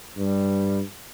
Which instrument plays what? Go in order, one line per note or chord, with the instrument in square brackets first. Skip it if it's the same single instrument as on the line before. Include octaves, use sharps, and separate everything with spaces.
[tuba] G2 [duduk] G3